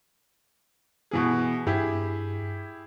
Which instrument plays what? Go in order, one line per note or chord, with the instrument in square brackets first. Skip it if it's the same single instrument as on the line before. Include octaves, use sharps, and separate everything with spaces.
[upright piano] B2 E3 G#4
[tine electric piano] G2 [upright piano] E4 G4 G#4